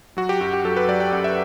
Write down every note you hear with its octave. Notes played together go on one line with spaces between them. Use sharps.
F#3 F#4
G4
F#2 F#4
G4
F#3 A4
B4
F#3 D5
G5
F#2 F#5
E5